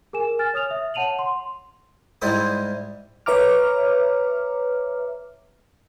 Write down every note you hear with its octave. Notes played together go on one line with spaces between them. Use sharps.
G#4 A#4 G#5 E7
G#5 F6 A6
C#5 D#6 F6 F7
E5
C#5 F#5 A5 D#7 F7 F#7
C6
G#2 G3 E4 C5 E5 D#6
B4 C#5 E5 A#5 D6 F6